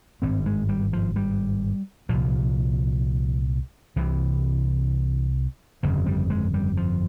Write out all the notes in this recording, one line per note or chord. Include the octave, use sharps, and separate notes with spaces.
G#1 G2 C4
G#3
G3
F3
G3
C2 A#2 F3
C2 C3 E3
G1 F2 C#3 F3
G3
G#3
G3
F3